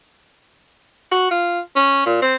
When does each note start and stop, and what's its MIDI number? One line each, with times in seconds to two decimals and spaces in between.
1.11 1.30 66
1.31 1.60 65
1.76 2.04 61
2.06 2.18 46
2.22 2.35 60